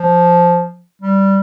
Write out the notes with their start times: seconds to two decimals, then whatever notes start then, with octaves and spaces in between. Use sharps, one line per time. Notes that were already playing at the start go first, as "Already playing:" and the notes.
Already playing: F3
1.02 G3